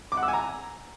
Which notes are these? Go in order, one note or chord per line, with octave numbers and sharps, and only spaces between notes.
D6
F#5
E6
G#5
A#5